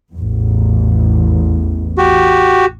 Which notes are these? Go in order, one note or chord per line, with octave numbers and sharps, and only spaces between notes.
A1 E2
F#4 G4